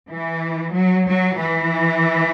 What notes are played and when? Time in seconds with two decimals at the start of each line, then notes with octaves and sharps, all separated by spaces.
0.11 E3
0.75 F#3
1.08 F#3
1.39 E3